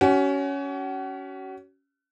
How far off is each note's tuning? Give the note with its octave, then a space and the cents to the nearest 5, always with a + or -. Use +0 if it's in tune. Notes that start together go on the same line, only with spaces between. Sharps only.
C#4 +15 F#4 +35